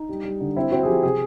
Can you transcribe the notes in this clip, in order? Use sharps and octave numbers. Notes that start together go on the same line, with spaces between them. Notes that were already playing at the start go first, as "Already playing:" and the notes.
Already playing: D#4
G3
G3
D3
C4 E4
C4 F#4
G#4
F3 G4
C3 G#4